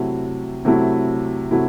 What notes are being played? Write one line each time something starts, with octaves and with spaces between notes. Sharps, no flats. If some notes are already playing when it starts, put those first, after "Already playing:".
Already playing: C3 F#3 A3 E4
C3 F#3 A3 E4
C3 F#3 A3 E4